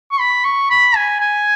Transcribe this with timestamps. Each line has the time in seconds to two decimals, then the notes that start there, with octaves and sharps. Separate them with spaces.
0.11 C#6
0.20 B5
0.44 C#6
0.70 B5
0.96 G#5
1.20 G#5